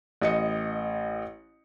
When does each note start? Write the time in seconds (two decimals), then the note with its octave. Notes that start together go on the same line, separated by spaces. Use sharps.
0.21 A1 D#5 C#7